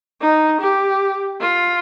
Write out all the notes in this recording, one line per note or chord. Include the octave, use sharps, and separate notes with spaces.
D#4
G4
F4